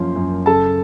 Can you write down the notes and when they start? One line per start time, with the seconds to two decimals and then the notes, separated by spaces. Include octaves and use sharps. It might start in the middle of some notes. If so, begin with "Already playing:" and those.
Already playing: F#2 F3 A#3 C#4 C6
0.16 F#2
0.46 C#3 A4 A5